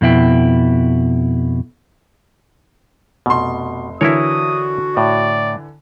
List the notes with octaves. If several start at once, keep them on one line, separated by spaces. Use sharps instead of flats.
F2 B2 E4 G5
F1 B2 C6
D3 E3 E4 F#4 A#4 C#5 D#6
A2 D5